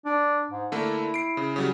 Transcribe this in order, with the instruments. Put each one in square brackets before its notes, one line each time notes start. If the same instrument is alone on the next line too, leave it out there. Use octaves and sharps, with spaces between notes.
[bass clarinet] D4
G#2
[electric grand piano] D3 A3 A#3 [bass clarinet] E4
[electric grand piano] C7 D7
C#3
C#3 F#3 G3